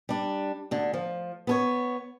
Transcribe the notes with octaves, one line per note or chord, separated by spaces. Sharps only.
G3 D4
D2 D3
F3
B3 A4 C#5